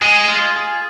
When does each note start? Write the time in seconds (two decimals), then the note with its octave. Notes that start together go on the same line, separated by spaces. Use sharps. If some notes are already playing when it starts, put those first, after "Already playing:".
0.02 G#3 G#4
0.28 F4
0.56 G#4